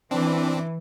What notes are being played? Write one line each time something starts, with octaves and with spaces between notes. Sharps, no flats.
E3 C4 D4 D6